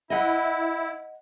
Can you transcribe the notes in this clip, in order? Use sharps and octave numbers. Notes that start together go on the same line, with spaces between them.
E4 D#5 F#5